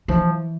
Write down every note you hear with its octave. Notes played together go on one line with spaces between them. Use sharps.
E3 F3